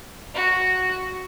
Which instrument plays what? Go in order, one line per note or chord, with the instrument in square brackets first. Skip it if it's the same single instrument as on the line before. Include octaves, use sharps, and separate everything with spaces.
[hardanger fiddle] F#4